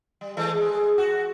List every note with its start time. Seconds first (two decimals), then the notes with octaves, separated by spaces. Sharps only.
0.21 G3
0.37 E3 G#3 A3
0.57 G#3
0.98 F#4